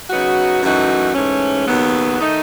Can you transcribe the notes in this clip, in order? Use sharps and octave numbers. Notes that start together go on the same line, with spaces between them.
C#3 F#3 B3 D#4 F#4
F#2 E3 A3 D#4 F#4
G#2 E3 A3 C#4
D#2 C#3 F#3 B3
D#3 A3 D#4